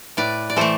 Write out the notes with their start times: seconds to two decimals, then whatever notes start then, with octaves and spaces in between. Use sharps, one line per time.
0.17 A2 B4 D5
0.50 D5
0.56 E3 A3 A4 C5